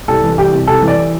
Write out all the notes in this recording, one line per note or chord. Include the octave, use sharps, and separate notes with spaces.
C2 A4
E3
C2 G4
C3
C2 A4
E3
D5